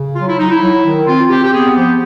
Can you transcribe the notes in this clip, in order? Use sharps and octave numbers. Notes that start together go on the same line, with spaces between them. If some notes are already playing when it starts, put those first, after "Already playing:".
Already playing: C#3
F#3 F4
E4
F#3 D#4
E4
F#3
D#3
C4 F4
C4 G4
G4
B3 G#4
F3 G4